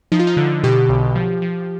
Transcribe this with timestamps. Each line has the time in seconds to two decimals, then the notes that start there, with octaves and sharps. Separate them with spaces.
0.12 F3 D#4
0.19 F4
0.27 D#4
0.37 D3
0.63 B2 G4
0.89 B1
1.15 F3
1.42 F3